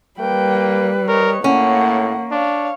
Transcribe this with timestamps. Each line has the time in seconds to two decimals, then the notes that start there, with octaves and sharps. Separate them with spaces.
0.20 G3 A#3 B4 G5
1.08 A#4 C#5 D#5
1.44 A2 A#3 C#4 F#5
2.32 D4 C#5 F5